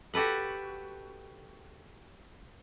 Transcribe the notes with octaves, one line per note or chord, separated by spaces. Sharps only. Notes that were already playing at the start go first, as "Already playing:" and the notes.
F#4 G4 A4 B4 F#5